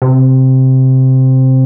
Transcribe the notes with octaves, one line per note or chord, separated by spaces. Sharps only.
C3